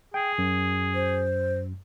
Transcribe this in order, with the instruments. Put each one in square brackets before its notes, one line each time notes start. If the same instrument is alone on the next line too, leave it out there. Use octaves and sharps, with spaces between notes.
[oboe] G#4 [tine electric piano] G5
[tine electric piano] F#2
[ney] C5